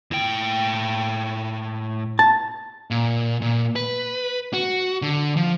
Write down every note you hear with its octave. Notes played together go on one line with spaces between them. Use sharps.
A2 G5
A5
A#2
A#2
B4
F#4
D3
F3